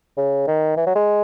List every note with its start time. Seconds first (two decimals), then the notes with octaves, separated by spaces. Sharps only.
0.17 C#3
0.47 D#3
0.77 E3
0.86 F#3
0.96 G#3